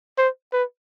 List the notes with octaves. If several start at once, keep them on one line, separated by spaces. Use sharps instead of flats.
C5
B4